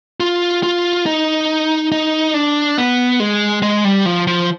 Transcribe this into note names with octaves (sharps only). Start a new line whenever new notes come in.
F4
F4
D#4
D#4
D4
B3
G#3
G#3
G3
F3
F3